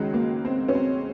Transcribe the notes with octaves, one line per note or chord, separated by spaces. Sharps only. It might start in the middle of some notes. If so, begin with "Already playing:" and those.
Already playing: C#2 D#3 F#3 G#3
A#3
C4
C#4
C4